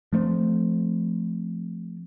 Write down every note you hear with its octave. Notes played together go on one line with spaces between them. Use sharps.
F3 A3 A#3 C4